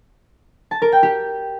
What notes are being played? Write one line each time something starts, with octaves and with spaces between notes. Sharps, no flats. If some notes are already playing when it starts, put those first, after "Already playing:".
A5
A#4
G5
G4